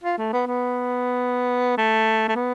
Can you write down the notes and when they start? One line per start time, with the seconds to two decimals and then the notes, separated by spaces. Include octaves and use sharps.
0.03 F4
0.18 A3
0.33 B3
0.47 B3
1.78 A3
2.28 A3
2.36 B3